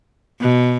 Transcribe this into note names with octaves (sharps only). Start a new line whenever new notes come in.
B2